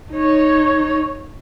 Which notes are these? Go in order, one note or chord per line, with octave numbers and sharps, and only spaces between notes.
D#4 C#5